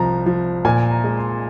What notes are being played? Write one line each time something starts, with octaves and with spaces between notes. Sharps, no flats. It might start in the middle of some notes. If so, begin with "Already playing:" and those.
Already playing: C2 F3 A#5
F3
A#2 G#5
A#5
G#3
C6